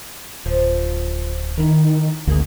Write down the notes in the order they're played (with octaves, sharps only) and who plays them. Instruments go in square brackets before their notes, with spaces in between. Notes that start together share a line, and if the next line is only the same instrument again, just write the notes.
[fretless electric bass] D1 [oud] F3
[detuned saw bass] D#3 [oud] E4 A#4
[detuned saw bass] G#1 [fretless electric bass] D2 [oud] A#3 G#4